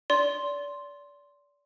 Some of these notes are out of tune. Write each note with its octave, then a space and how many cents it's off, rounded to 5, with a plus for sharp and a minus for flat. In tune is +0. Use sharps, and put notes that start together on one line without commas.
D5 -30 C6 +0